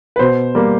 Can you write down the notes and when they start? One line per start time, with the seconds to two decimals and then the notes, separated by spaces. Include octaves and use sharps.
0.16 B4
0.19 B2 C5
0.55 G3 A#3